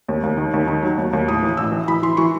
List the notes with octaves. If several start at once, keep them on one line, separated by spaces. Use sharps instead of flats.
D#2
D#2
D#3
D#2
D#3
F#3
D#2
D#2
A2 D#6
E3
A1 E6
E3
E3 B5
E3 C6
E3 C#6